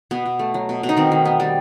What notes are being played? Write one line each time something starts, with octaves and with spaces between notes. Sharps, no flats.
B2 B3
B2
A3
F#3
B2
B2
D#4
D#3 C4
D#3
B3
G3